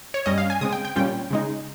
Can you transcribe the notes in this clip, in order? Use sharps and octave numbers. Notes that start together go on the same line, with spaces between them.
C#5
G2 G3 C#4 D#5
F5
G#5
C#3 G#3 C4 D#6
G5
G5
A#2 G3 C#4 F4 G5
C#3 G#3 D#4